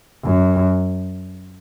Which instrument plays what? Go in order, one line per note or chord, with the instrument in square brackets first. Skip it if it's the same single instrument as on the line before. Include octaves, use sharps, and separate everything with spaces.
[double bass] F#2